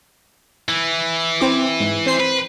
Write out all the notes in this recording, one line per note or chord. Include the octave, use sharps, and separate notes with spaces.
E3
C4 E4 D6
G#2
C4 C5 C7
B4